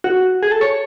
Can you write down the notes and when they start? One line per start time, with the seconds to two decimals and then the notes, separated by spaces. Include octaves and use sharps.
0.04 F#4
0.43 G#4
0.51 A4
0.61 C#5